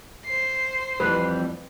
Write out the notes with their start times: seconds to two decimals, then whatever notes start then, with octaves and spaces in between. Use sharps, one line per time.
0.24 C5 C7
1.00 F2 E3 G3 B4